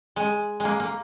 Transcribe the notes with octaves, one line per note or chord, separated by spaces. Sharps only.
G#3
G#3
A#3
A#3